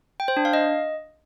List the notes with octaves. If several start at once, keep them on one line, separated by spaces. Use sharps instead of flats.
G5
C5
D4
F5
D#5